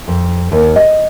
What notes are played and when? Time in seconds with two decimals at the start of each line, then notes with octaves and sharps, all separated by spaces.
0.08 F2
0.52 D#2
0.76 D#5